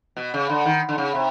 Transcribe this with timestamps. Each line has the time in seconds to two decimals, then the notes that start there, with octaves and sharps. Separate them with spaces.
0.17 B2
0.34 C#3
0.49 D3
0.66 D#3
0.89 D3
0.98 C#3
1.15 C3